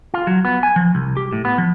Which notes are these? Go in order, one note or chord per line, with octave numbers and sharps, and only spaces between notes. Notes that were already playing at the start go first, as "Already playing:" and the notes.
F4
F#3
B3
G#5
F3
C2
G4
A2
B3
F3